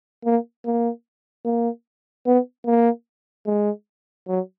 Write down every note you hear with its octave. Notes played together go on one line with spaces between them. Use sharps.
A#3
A#3
A#3
B3
A#3
G#3
F#3